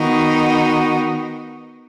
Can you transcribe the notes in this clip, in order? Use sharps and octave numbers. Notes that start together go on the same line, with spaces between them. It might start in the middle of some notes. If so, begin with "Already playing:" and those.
Already playing: D#3 B3 D#4 F#4